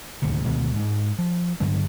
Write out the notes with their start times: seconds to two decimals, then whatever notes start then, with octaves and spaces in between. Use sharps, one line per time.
0.22 D#1 D2 G#2 C3
0.45 D2 B2 D#3 G#3
0.76 G#2 G#3
1.19 F3
1.60 G2 D3 F#3 G#3